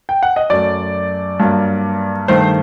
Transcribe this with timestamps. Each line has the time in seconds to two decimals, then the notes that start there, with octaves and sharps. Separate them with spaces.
0.09 G5
0.23 F#5
0.36 D#5
0.50 F#2 F#3 A3 D5
1.39 G2 F#3 A#3
2.28 G2 D#3 A3 C5